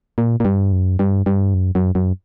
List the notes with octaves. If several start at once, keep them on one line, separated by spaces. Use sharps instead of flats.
A#2
A#2
G2
F#2
G2
G2
F#2
F#2
F#2